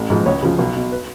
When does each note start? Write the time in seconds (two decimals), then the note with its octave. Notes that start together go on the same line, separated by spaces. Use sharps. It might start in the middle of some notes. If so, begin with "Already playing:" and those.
Already playing: A1
0.10 G#2 F3
0.26 C#2 C#5
0.42 C#3 F3
0.58 B1
0.76 B2
0.92 B4